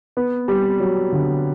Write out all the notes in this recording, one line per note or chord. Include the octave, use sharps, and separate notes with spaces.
B3
G3
F#3
D3